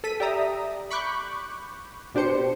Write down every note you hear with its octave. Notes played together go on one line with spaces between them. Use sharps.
A4 B6 D#7
G4 D5 E5 A#5 D#6
B5 C#6 D6 F#6 G6
B2 D4 G4 C5 C#7